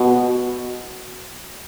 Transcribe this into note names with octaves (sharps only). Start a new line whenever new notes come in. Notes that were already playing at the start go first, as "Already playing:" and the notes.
Already playing: B2